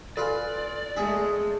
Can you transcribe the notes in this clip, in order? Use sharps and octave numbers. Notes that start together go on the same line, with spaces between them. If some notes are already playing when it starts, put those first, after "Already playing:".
F4 A4 B4 D5 G#5
G#3 A3 G#4 E5